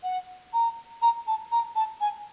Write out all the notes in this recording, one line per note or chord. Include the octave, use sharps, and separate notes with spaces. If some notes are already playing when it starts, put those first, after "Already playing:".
F#5
A#5
A#5
A5
A#5
A5
G#5